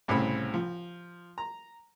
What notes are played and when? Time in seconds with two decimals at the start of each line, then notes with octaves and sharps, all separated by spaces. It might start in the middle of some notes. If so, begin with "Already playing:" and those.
0.08 C2 A2 C#3 C4 B5
0.54 F3
1.38 A#5